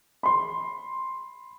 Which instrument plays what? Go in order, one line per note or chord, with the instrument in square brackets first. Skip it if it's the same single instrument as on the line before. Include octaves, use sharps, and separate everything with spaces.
[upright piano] B5 C6